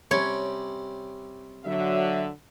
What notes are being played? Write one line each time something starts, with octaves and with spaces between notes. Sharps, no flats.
C3 G3 C#4 C#5
D3 F#3 E5